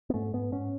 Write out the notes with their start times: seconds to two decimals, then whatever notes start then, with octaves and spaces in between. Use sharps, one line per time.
0.10 B3
0.14 G#2 A3
0.33 G#2 B3
0.52 G#2 C#4